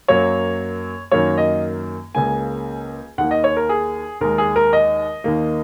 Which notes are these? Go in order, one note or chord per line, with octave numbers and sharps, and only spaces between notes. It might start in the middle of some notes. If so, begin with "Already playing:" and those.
F#2 F#3 A#3 C#5
F#2 D#3 F#3 A#3 C#5
D#5
C#2 C#3 A#3 G#5
D#2 D#3 A#3 F#5
D#5
C#5
A#4
G#4
D#2 D#3 G#3 A#4
G#4
A#4
D#5
D#2 D#3 A#3